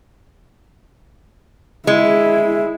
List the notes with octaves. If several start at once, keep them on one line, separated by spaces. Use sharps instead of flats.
G#3 E4